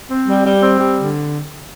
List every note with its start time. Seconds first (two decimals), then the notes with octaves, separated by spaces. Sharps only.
0.10 C4
0.28 G3
0.46 G3
0.62 C4
0.80 G3
0.98 D3